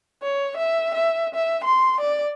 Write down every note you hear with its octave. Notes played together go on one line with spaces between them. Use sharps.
C#5
E5
E5
E5
C6
D5